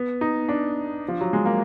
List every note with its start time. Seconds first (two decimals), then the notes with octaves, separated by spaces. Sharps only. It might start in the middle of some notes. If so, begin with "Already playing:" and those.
Already playing: B3
0.21 D#4
0.49 D4
1.08 F3
1.21 F#3
1.33 G#3
1.45 A#3